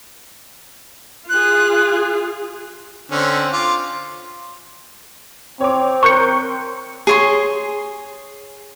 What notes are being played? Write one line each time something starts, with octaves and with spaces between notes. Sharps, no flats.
F4 G#4 F#6
D3 C4 C#4
F4 D6
C4 C#5 D6
A#4 C#6 F#6 G6 C#7
G#4 C#5 C6